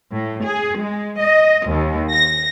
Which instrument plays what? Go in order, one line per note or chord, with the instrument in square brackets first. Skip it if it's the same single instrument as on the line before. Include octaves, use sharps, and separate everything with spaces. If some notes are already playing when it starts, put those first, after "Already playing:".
[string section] A2
G#4
G#3
D#5
D#2
A#6